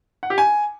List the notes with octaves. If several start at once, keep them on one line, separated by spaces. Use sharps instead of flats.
F#5
G4
G#5